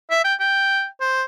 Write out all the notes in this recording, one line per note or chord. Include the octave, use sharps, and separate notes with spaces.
E5
G5
G5
C5